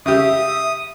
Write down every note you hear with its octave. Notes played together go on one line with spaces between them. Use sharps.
C#3 G4 E5 D#6